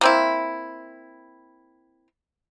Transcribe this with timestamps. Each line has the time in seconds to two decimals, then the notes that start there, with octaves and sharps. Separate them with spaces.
0.01 A#3 C4 E4